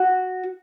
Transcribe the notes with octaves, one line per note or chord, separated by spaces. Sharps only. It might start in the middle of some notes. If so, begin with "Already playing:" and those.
Already playing: F#4